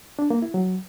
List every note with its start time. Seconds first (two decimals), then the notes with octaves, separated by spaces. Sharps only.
0.19 D4
0.30 A#3
0.42 E4
0.54 F#3